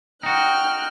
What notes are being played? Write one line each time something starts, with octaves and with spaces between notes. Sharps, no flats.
D#4 F#4 G5 F6 F#6